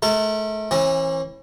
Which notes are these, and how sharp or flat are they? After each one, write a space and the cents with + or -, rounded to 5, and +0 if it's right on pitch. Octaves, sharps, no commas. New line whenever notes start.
A3 -35 A#4 -45
E3 -5 C#4 -45